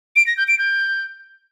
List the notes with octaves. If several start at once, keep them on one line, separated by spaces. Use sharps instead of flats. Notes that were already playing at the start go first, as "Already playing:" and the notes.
D7
A#6
G6
D7
G6